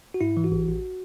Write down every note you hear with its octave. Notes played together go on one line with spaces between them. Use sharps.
F#4
G#2 E4
E3
F#4
A1
A1